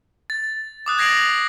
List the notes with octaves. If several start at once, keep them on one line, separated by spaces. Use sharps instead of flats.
A6
D6 D#6 F#6
G#6 A#6 C7 D7 F7 F#7